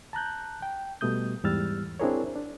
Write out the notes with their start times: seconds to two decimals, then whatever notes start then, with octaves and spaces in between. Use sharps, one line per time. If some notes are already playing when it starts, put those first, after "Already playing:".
0.13 A5 A#5 F#6 G6
0.62 G5
1.01 B2 G3 A3 D#6 G6
1.44 E2 G#2 G3 E6 F6 A6
2.00 C4 D4 E4 G#4 A#4 C#5
2.35 D4